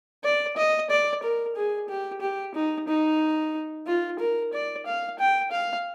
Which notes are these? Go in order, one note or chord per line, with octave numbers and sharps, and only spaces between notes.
D5
D#5
D5
A#4
G#4
G4
G4
D#4
D#4
F4
A#4
D5
F5
G5
F5